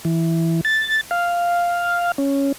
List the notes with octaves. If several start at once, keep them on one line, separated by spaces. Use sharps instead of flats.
E3
A6
F5
C#4